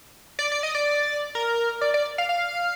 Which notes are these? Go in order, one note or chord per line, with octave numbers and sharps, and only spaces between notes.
D5
D5
D#5
D5
A#4
D5
D5
F5
F5